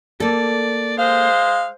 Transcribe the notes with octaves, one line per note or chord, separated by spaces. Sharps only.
A#3 A4 D5
G#3 C5 F5